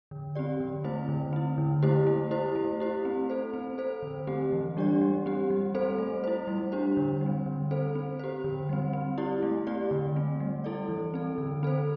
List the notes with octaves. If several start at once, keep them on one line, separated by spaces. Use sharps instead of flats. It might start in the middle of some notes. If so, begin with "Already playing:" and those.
D3
C4 G4 D5
D3
A3 C4 E4 C5
D3
C4 E4
D3
A3 E4 G4 C5
A3
E4 G4 C5
A3
E4 G4 C5
C4
A4 C5
C4
A4 C5
D3
A3 C4 G4
E3
G3 D4 G4 D5
G3
C4 G4
G3
C4 A4 C5
A3
E4 C5
G3
D4 G4 C5
D3
G3
C4
D3
C4 A4 C5
C4
G4 C5
D3
G3 C4
C4
E4 G4 D5
A3
C4 G4 D5
D3
A3 C4
G3
E4 A4 D5
E3
C4 A4
D3
C4 A4 C5